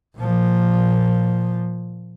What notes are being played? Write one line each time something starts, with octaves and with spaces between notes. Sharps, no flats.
A#2 F3